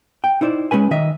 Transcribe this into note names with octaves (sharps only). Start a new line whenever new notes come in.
G5
D#4 E4 C5 D5
G#3 C#4 B4 G#5
D#3 D#5 E5